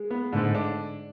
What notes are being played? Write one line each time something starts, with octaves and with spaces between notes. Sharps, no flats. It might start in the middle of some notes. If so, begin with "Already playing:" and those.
Already playing: G#3
B3
G#2 D3
D4